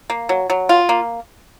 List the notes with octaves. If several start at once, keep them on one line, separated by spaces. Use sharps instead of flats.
A#3
F#3
F#3
F4
A#3